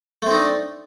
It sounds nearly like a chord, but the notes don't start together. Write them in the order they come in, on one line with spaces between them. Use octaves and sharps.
A3 C4 D#4 D4